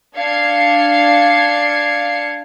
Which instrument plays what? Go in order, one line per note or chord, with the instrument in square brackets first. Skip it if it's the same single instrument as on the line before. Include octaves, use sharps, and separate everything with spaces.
[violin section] D4 F5 G#6 C7 C#7